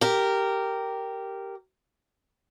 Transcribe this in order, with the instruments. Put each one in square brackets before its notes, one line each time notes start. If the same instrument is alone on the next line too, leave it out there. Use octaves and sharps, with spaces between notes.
[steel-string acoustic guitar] G4 A#4